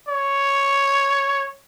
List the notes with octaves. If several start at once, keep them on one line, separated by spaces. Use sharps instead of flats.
C#5